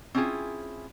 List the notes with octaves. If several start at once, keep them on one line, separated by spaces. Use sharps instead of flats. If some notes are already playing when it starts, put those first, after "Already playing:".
C4 C#4 E4 F4 G#4